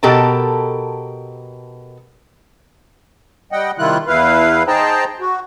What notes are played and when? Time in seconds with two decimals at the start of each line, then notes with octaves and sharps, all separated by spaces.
0.03 B2 G4 A4 A#4 A5
3.52 G3 D#5 F#5 G5
3.78 C3 D#3 G3 E4 F4 F#6
4.08 E2 E4 B4 F5
4.68 D#4 G#4 C5 G5 A5 A#5
5.20 F#4